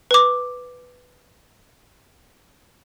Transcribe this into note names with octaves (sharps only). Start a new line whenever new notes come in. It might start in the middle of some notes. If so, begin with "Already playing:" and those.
B4 D6